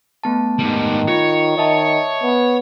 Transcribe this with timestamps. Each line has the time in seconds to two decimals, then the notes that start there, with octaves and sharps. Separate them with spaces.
0.24 A3 B3 A5
0.59 G#2 D#3 G3
1.08 F4 C#5 C#7
1.57 D#3 D#5 E5 A5
2.23 B3